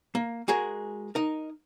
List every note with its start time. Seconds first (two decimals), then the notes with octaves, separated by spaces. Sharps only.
0.15 A#3
0.48 G#3 F#4 G#4 A#4
1.15 D#4 A#4